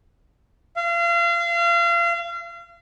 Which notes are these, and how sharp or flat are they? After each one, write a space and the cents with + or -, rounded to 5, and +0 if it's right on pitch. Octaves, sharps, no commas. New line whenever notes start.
F5 -35